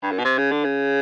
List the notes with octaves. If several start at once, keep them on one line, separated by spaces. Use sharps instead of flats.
G2
F#2
B2
C3
C#3
D3
C#3